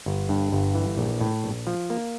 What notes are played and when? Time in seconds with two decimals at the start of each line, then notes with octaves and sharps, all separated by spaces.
0.06 G1
0.29 G2
0.52 G1
0.75 E3
0.97 A#1
1.21 A2
1.44 A#1
1.67 F3
1.90 A#3